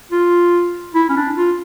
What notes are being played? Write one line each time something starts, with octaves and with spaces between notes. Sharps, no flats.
F4
E4
C#4
D4
F4